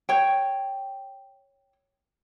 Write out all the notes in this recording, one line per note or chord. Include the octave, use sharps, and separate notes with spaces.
C#5 G5